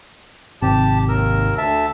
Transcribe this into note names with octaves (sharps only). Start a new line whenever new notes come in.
G#1 C3 G4 A5
D#2 A#4 E6
D2 E5 A5